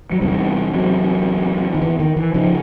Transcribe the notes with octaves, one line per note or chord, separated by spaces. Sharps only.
F#3
E2 C3 G3
F#3
D#3
E3
D#3
E3
C#3 F3